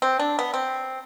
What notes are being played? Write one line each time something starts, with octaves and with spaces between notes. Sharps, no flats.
C4
D4
B3
C4